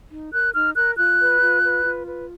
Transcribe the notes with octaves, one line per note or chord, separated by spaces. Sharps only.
D#4
A#4 F#6
D#4 F6
A#4 F#6
F4 F#6
B4
F4
B4
F4
B4